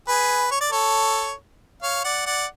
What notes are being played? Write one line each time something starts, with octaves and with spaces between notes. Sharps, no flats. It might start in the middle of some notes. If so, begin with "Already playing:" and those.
G#4 B4
C#5
D5
A4 C#5
C#5 F5
D5 F#5
D5 F#5